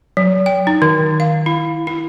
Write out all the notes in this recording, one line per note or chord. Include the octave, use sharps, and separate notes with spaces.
F#3
G5
D#4
D#3
F5
E4
E4